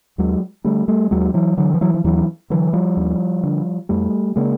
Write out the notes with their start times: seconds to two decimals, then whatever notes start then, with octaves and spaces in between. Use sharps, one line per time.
0.18 D#2 F#3 G#3
0.64 D3 G3 A3
0.88 G3 A3
1.11 D#2 F#3 G#3
1.34 E3 F#3
1.57 D3 E3 F#3
1.74 F3
1.81 E3 F#3
1.94 F3
2.04 D#2 E3 F#3
2.50 D3 E3 F#3
2.73 F3 G3
2.97 D#2
3.43 D3
3.89 F2 G3 A3
4.36 C#3 G#3 A#3